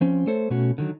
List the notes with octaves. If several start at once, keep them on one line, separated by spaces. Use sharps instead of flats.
F3 C4 C#4
A3 A4 C5 C#5
B2 A3 C#4 F#4
D3 D#3 F#3